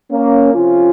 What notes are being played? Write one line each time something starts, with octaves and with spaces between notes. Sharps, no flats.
A#3 C#4
F2 C3 F3 C#4 F4